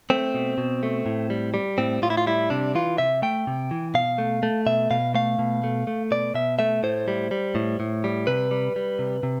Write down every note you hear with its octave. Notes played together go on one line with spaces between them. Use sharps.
A3 C4
B2
B2
A3
A2
G3
G3
A2 C4
A2 F4
E4
F4
G3 E4
C3 D4
E3 F4
C3 E5
A3 G5
C3
E3
B2 F5
A3
A3
B2 E5
B2 F5
A3 F5
B2
A3
A3
B2 D5
B2 E5
A3 E5
A2 C5
G3
G3
A2
A2
G3
C3 B4
G3
G3
C3
C3